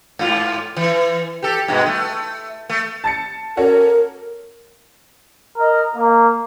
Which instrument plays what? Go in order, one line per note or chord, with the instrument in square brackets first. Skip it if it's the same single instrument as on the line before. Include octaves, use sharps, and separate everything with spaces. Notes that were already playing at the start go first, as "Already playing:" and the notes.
[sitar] G#2 F4
E3
G4 A4
G2 B2 G#3
A3
A3
[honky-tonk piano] A5 A6 C#7
[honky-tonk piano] C#4 F#4 A4 [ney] A#4
[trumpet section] A#4 D#5
A#3